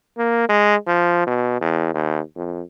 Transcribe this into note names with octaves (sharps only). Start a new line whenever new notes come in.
A#3
G#3
F3
B2
E2
D#2
F2